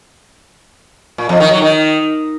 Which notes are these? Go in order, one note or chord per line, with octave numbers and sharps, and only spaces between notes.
A#2
F2
D#3
F#3
D#3